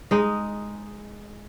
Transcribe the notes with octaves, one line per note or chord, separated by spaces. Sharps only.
G#3 D#4